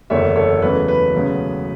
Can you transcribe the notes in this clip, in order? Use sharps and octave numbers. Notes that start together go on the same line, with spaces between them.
F#1 E2 D3 A3 C#5 E5
A4 C#5
E2 C#3 F#3 A3 B4
B4
E1 D2 C#3 F#3 B3